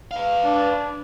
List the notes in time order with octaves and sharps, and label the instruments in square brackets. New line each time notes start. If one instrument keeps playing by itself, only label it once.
[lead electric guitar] B4 F5
[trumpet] D4